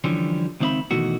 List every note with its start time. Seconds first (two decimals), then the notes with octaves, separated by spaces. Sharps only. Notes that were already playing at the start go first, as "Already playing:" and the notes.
0.04 D3 E3 F3 G3 C#4
0.60 C#2 D#3 C4 D5 E5 B5
0.91 B2 D#3 E3 A3 F#4